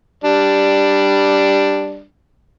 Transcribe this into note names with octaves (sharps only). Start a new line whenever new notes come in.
G3 D4